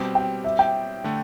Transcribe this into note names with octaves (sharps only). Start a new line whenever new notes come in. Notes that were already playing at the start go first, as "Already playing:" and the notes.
Already playing: B2 G3 C4 G4
G5
E5
G5
D3 A3